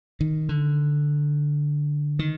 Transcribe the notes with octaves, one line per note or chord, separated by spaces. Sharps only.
D#3
D3
D#3